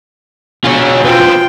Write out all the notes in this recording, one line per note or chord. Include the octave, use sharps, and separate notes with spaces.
B2 F4 G#4 C#5
B3 C4 F4 G5